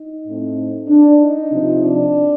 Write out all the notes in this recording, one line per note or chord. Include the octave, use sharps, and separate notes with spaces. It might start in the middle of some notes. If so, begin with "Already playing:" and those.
Already playing: D#4
A2 A3 C4
D4
D#4
C3 F3 C4
D4